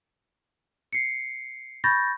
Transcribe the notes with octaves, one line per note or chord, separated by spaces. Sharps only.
C7 C#7
B5 C#6 G6 A6 A#6